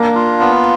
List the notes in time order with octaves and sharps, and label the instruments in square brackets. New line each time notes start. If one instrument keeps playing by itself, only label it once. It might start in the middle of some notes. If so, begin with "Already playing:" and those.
Already playing: [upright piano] A#3 [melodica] D4
[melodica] F4
B3